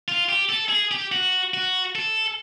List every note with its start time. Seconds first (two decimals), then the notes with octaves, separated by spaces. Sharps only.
0.08 F4
0.29 G4
0.49 A4
0.69 G#4
0.91 G4
1.12 F#4
1.54 F#4
1.95 A4